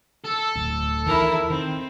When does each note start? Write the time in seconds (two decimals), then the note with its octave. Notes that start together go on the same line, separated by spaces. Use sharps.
0.25 A4
0.55 D1 D2
1.07 E2 D#3 F3 E4 A#4
1.50 D#3 C4